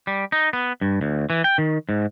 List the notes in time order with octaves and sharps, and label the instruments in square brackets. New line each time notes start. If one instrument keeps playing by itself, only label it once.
[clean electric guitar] G3
D#4
B3
G2
D2
E3
G5
D#3
G#2